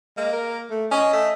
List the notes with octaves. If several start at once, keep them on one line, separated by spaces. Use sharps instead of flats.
G#3 A#3
A#4
A3
C#4 D#5
A3